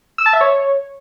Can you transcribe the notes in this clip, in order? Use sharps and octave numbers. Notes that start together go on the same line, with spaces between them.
E6
A5
E5
C#5